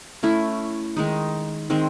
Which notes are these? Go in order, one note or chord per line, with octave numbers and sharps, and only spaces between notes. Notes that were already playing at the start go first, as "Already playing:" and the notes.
A3 C#4 E4
D#3 G#3 D#4
D#3 G#3 C4